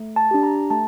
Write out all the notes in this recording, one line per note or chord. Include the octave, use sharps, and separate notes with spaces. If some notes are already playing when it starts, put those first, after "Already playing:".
Already playing: A3
A5
D4 G4
A#5
A3 A5